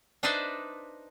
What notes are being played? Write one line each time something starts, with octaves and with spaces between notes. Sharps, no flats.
D4 D#4 B4 C5 D5 E5